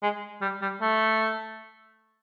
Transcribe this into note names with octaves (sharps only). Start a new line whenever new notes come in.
G#3
G3
G3
A3